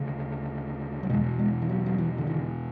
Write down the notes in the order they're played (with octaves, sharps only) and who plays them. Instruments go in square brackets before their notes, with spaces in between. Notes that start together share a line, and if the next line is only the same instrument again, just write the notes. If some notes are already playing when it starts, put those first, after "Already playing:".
Already playing: [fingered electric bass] D2 C#3
F#3
E2 B2 G#3
G#3
E3
F#3
F#3
E3
D3
E3